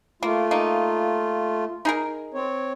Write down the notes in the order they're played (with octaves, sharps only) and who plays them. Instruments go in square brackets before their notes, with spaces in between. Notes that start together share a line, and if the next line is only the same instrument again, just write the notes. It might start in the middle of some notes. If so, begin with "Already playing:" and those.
[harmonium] A3 F4 [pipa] A#3
[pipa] A#3 D#4
D#4 G#4 A#4
[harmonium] C4 C#5